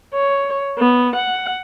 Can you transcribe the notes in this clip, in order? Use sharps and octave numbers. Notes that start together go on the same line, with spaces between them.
C#5
B3
F#5